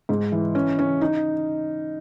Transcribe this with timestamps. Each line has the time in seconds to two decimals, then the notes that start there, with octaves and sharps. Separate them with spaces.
0.09 G#2
0.32 E3
0.55 C#4
0.79 C#4
1.01 D#4